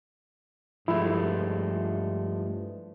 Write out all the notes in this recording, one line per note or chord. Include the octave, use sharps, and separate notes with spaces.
G2 F3 G#3 A3 E4